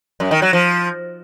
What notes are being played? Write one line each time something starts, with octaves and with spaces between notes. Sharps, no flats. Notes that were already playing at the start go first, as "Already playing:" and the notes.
F#2
D#3
F#3
F3